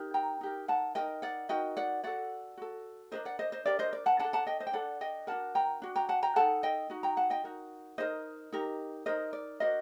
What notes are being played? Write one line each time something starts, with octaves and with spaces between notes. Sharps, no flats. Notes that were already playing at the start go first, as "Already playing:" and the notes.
Already playing: D#4 G4 A#4
G5 A#5
D#4 G4 A#4
F#5 A5
D#4 F#4 A#4 D#5 G5
D5 F#5
D#4 F#4 A#4 D#5 G5
D5 F#5
F#4 A4 D5 F#5
F#4 A4
D4 G4 A#4 C5 D#5
D5 F#5
C5 D#5
C5 D#5
D4 G4 A#4 D5
C5 D#5
D5
F#5 A5
D4 A4 F#5 A5
F#5 A5
D#5 G5
C5 D#5
G5
D4 A4 D5 F#5
D#5 G5
D4 F#4 A#4 F#5 A5
G5 A#5
D4 F#4
G5 A#5
F#5 A5
G5 A#5
D#4 F#4 A4 F#5 A5
D#5 G5
D#4 F#4
G5 A#5
F#5 A5
D#5 G5
D#4 F#4 A#4
D#4 F#4 A#4 C5 D#5
D#4 G4 A#4
D#4 G4 A#4 C5 D#5
D5
D4 F#4 A#4 C5 D#5